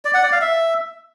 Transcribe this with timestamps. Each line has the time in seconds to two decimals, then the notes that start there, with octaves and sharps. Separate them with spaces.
0.05 D5
0.14 F#5
0.23 D5
0.32 F5
0.41 E5